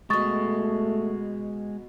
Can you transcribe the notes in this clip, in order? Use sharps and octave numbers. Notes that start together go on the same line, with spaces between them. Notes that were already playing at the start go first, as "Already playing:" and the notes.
B2 G#3 A3 A4 C#6 D#6 A6